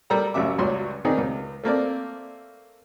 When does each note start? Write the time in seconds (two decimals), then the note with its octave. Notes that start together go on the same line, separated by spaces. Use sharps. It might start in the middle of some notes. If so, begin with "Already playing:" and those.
0.10 G3 A4 A#4 A#5
0.34 A1 F#2 C#3 E5 D6
0.58 G#1 C#2 F#3 G3 C#5 C6
1.05 D#3 B3 C4 D#4 G#4 D5
1.17 C#2
1.64 A3 A#3 C4 D5